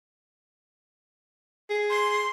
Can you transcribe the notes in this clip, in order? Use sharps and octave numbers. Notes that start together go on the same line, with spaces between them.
G#4
C6